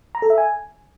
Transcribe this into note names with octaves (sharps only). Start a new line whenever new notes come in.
A#5
A4
E5
G#5